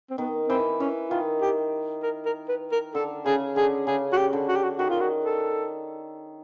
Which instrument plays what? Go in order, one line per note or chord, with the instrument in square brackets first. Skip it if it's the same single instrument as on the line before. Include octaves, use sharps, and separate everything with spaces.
[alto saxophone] C4
[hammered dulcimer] D#3 [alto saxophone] B3
[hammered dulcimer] E3 [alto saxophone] C4
[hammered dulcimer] E3 [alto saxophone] C#4
[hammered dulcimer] D#3 [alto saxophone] F4
[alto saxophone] G4
A#4
A#4
B4
A#4
[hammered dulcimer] D3 [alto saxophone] A4
[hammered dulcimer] C#3 [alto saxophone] G#4
[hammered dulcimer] D3 [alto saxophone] G#4
[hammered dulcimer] C#3 [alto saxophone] G#4
[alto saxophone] F#4
G4
[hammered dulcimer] D3
[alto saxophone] F#4
G4
F#4
[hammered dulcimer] D#3 [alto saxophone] F#4
[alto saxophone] F4
F#4
A4